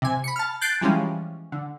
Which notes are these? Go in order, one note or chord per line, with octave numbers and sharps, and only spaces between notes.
C3 G#5
B5 C#7
A5 F6
F#6 G6 A6 C7 D7
E3 F3 G3 G#3 C#4
D3